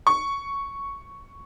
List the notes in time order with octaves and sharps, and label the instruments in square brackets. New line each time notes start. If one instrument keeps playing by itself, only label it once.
[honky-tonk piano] C#6